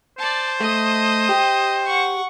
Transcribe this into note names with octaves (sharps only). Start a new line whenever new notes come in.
C5 D5 A5
A3 D#5 D#6
G4
F#5 C#6